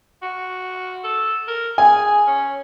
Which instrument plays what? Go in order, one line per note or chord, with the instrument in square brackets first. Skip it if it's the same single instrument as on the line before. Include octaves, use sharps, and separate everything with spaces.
[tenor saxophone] F#4
A4
A#4
[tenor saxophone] G#4 [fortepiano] G#5
[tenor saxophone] C#4